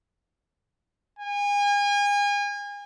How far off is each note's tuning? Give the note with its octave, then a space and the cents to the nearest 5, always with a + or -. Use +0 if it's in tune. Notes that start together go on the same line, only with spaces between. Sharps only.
G#5 -35